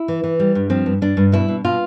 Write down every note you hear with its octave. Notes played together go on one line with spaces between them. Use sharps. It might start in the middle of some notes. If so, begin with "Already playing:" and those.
Already playing: E4
E3
E3
G3
G2
F3 C4
G2
G2 D4
G2
B2 E4
B2
B2 F4